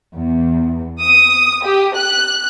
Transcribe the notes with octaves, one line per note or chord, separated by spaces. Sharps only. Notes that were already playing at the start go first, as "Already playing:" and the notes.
E2
D#6
G4
F#6